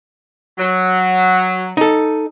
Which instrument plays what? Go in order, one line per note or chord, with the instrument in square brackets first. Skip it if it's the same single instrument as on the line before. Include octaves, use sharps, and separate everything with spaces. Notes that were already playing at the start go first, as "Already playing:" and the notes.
[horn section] F#3
[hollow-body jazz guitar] D#4 A4